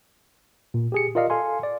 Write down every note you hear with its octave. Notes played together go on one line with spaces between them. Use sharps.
A#2
G4 G#4 C#7
F4 A#4 D5 D#5 F5
A4 F5 G#5 C6
D5